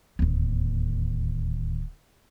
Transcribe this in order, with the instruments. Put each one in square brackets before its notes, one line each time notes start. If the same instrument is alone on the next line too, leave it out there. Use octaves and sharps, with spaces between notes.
[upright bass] D1 D#2